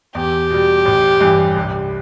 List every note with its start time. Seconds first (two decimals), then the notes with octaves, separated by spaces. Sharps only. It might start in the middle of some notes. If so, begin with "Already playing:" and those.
0.15 E2 G4
0.50 B2 G3
0.85 A1
1.21 G2 E3
1.56 C2